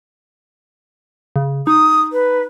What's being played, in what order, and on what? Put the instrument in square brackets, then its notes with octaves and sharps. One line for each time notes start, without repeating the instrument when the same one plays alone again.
[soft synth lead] C#3
[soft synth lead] D#4 [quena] D#6
[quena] B4